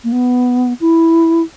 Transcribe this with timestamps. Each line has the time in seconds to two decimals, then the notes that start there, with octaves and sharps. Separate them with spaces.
0.04 A#3
0.12 B3
0.81 E4